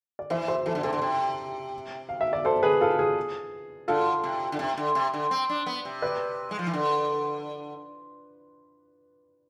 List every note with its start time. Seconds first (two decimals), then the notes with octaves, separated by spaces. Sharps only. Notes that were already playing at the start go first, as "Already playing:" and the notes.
0.19 D5
0.30 E3 C5 E5
0.48 C5 E5
0.66 E3 A4 C5
0.75 D3
0.83 C3 A4 C5
0.93 D3
1.02 C3
2.09 F5
2.21 E5
2.33 D5
2.45 A4 C5
2.63 G#4 B4
2.81 F4 A4
2.99 G#4
3.88 D3 F4 A4
4.24 C3
4.52 D3
4.59 C3
4.78 D3
4.95 C3
5.14 D3
5.31 C4
5.50 D4
5.66 B3
5.85 C3
6.02 B4 D5
6.51 G#3
6.59 F3
6.67 E3
6.73 D3